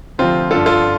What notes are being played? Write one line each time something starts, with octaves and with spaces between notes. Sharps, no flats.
D2 C3 F3 C4 F4
G2 D3 F3 F4 A4
F4 A4